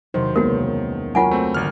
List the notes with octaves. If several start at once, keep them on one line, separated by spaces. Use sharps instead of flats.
E2 C3 D#3 F#3 C5
C#2 G#3 A#3 B3 F#4 A#4
F#3 F4 A#4 C#5 F#5 G#5
A3 C4 F#4 G4 B5
G#1 D3 F6